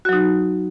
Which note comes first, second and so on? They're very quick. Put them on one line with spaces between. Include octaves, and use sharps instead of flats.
F#4 F#3 D#4